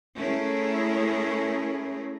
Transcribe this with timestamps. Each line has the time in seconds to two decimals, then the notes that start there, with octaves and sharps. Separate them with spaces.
0.16 A3 C#4 E4 G#4 A#4